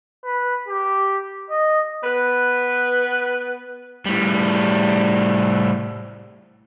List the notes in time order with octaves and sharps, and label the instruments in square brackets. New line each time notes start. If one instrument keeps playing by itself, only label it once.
[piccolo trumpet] B4
G4
D#5
[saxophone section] B3 B4
[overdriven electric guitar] A2 G3